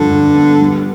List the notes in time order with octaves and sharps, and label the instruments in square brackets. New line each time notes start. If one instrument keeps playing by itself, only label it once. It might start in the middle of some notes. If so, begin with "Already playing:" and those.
Already playing: [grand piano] G2 F3 [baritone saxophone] D3
[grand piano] G2
B3
G3